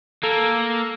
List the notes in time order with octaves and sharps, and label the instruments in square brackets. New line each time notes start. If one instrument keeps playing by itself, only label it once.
[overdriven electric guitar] A#3 [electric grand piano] A4